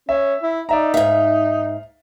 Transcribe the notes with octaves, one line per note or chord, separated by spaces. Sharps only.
C#4 E5
E4
D#4 D5 E5 A#5
G#2 E5 F5